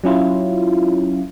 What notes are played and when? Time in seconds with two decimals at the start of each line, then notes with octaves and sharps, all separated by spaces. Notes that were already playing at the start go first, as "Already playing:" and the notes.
0.04 F#3 C#4 E4 F4